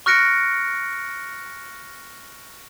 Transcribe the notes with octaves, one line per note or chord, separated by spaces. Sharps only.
C#6 F6 F#6 A#6 C#7 D7